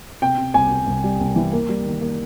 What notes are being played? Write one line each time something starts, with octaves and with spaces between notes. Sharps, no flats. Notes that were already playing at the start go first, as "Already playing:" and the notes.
C3 G5
C3
C2 G#5
C3
C2
G3
C2
E3
A#3
G3
D#3
A#3